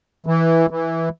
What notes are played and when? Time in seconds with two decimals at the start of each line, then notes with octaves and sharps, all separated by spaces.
0.27 E3
0.70 E3